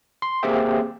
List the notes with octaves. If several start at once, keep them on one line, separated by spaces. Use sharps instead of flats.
C6
A#3 C4 G4 G#4 E5 G5